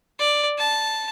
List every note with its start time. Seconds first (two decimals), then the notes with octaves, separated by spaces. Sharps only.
0.20 D5
0.58 A5